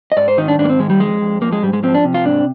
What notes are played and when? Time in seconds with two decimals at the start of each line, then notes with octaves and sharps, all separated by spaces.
0.12 D#5
0.17 G#2 D5
0.28 C5
0.37 D#3 D#4
0.48 D4
0.59 G#2 D4
0.65 A#3
0.70 C4
0.79 D#3 G#3
0.90 G3
1.00 F2 G#3
1.21 F2
1.42 F3 A#3
1.52 G#3
1.63 G#2 G3
1.73 G#3
1.83 F3 C4
1.94 D4
2.04 C3
2.14 F4
2.25 G#2 D4